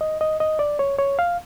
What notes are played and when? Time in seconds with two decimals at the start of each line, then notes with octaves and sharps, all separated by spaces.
0.01 D#5
0.21 D#5
0.40 D#5
0.59 D5
0.79 C#5
0.99 C#5
1.19 F5